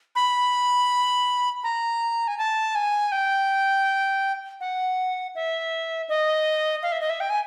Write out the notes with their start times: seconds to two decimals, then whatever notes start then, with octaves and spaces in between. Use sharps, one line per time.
0.16 B5
1.64 A#5
2.28 G#5
2.38 A5
2.75 G#5
3.12 G5
4.61 F#5
5.35 E5
6.09 D#5
6.83 F5
6.92 E5
7.01 D#5
7.10 E5
7.20 G5
7.30 G#5